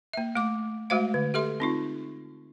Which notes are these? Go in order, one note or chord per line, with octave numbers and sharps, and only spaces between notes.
A#3 E5
A3 D6
G#3 A3 F#4 C5 F5
D3
G4 A4 E5 C6
C4 D#4 F4